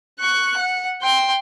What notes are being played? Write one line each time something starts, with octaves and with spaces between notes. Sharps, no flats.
C#6 F#6
F#5
G5 C6